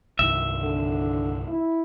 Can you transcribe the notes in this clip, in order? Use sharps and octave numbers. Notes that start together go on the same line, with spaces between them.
C2 G2 D#3 E5
D3
E4